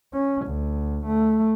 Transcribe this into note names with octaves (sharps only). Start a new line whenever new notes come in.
C#4
D2
A3